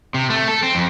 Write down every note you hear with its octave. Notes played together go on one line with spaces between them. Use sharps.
C3
A3
A4
C4
F2